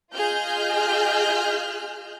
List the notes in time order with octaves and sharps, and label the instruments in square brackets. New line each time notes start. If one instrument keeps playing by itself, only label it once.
[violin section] F4 G#4 D#5 F6 G6